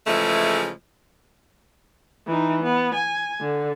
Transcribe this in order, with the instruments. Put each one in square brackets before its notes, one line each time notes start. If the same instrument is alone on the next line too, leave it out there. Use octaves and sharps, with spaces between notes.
[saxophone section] C#3 E3 F3 G#3 A3
[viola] E3 D#4
B3
G#5
D3